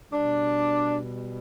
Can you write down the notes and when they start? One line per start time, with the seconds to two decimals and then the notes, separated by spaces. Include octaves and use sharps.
0.13 B2 G3 D4